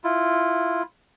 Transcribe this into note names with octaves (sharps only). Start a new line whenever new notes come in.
E4 F4